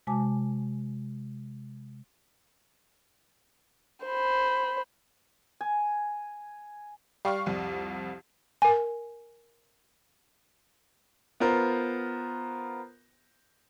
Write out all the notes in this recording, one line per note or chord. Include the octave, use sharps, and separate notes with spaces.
C3 G#3 F#4 G#5 A5 D6
C5 B5
G#5
G3 F5 C#6
C2 F2
A#4 G#5
B3 F4 A#4 C5